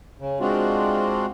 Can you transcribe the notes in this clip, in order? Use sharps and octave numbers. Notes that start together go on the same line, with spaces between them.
C#3
G#3 C4 D4 F4 F#4